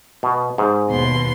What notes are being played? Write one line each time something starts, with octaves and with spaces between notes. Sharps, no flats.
B2
G#2
D#2 B2 C6